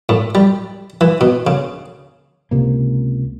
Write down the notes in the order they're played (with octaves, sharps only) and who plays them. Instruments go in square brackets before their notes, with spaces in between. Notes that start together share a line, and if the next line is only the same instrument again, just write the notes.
[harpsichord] A2
G3
E3
B2
C#3
[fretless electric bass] C#2 C3 A#3